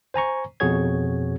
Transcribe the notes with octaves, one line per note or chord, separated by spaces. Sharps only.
C5 G#5 A#5 C#6
F2 B2 F#4 G#4 C#5 G#6